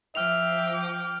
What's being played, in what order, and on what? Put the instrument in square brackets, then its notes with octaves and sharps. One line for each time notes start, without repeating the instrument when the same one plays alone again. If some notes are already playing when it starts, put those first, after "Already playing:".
[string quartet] F3 G5 D6 [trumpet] E5 [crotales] F6 F7